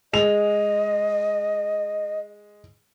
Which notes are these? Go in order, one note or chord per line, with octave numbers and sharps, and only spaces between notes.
G#3 D#5 F7